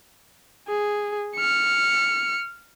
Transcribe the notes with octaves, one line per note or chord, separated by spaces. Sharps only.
G#4
F6 C#7